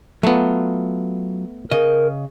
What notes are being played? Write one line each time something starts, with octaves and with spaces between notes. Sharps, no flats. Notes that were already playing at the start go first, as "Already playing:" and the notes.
F#3 A3 B3 F4
C#3 A#4 D#5